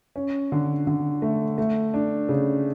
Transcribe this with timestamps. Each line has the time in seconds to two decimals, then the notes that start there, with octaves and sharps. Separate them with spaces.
0.16 C#4
0.52 D3
0.87 D3
1.22 A3
1.58 A3
1.94 D4
2.29 C#3